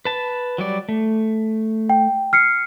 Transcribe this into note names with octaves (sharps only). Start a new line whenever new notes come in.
B4 A5
F#3 G3 D5
A3
G5
F6 C7 C#7